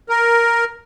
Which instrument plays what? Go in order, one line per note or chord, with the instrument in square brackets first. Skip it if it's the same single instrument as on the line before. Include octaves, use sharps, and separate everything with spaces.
[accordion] A#4